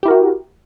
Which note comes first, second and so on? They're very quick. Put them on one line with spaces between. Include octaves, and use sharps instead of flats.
G4 E4 A#4 F#4